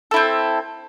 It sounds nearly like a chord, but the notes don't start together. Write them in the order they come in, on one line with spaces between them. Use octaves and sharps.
A4 E4 C4